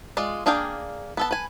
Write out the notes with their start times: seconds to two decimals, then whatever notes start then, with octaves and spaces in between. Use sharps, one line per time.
0.17 G#3 F4 D5
0.46 A#3 D4 G#4 F5 G5
1.17 B3 A4 A5
1.31 B4 G#5